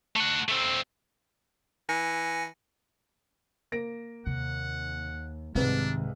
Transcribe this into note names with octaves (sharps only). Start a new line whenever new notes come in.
A3 F#5
A3 C4
E3 G#5 A#6 C#7
A#3 A#6 D7
D#2 C3 F#5
C2 G#2 C3 D#3 G#3 D4 B4